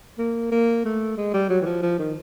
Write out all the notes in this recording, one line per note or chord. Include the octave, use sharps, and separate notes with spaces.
A#3
A#3
A3
G#3
G3
F#3
E3
F3
F3
D#3